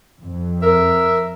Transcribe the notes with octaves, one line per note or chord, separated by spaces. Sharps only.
F2
A#4 E5